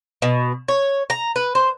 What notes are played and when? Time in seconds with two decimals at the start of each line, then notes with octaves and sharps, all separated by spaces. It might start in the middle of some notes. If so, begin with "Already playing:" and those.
0.22 B2
0.68 C#5
1.10 A#5
1.36 B4
1.55 C5